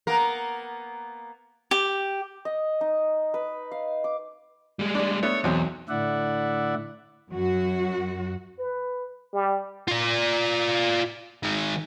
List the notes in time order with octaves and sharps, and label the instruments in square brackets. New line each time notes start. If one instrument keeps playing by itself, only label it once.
[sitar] A#3 B3 A#4
[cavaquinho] G4
[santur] D#5
D#4
B4
F5
D6
[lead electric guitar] G3 G#3
[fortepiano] D4
[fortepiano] A3 B3 D4 [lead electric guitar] C#5
[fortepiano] B1 F#3 C4 [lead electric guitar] E2
[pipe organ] A2 D3 E4 D5 E5 F#5
[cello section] F#2 F#3 F#4
[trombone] B4
G3
[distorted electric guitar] F4 D5
D#3 G#3